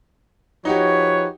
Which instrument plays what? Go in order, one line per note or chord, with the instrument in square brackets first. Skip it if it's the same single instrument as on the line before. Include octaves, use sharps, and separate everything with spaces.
[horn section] F3 B4 C#5 [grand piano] D#4 F#4 G4